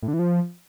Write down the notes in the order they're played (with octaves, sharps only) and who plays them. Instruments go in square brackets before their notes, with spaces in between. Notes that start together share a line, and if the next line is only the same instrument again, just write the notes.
[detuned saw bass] A2
D3
E3
F3